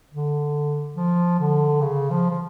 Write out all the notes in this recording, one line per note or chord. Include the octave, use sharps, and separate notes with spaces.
D3
F3
D3
C#3
F3
F3